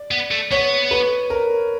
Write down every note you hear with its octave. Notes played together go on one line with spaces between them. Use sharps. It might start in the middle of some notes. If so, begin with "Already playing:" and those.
Already playing: D5
B3
A3
B3 C#5
B4
A#4